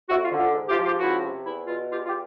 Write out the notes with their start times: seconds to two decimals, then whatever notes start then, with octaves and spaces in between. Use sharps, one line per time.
0.08 F2 E4 F#4
0.24 F4
0.31 D3
0.38 F4
0.54 G#2
0.69 F4 G4
0.77 F3
0.84 F4 G4
0.99 C#2 E4 F#4
1.22 C3
1.45 E2 E4
1.67 B2 F4
1.90 E2 F4 G4
2.05 F4 G4